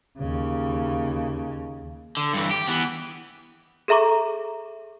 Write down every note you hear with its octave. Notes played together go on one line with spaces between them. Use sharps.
D#2 C#3
D3
G2 E3
G4
E3 B3
G#4 A4 E5 A#5 C#6 D6